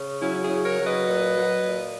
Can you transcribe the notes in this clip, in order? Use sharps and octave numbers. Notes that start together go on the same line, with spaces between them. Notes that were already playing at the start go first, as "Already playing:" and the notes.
Already playing: C#3
F#3 C#4 E4
E4 G#4
C#3
A#4 C#5
F#3
B4 D#5
A#2
F#3
A#2